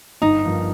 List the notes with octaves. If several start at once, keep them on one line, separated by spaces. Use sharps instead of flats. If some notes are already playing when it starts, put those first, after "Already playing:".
G1 D#4
G2 F3 A#3